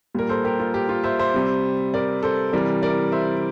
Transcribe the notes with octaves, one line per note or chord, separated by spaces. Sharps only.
A#2 G3 A#4
A4 C5
G4 A#4
F4 A4
G4
F4
C5 E5
C5 E5
C3 G3
A#4 D5
A4 C5
C3 E3 G3 A#4 D5
A#4 D5
C5 E5